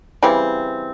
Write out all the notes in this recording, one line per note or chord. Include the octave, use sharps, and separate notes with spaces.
C#3 E3 G3 C4